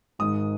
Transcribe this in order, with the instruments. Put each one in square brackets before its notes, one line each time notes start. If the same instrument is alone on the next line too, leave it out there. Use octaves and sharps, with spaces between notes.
[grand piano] G#1 G#2 D#3 G#3 D#6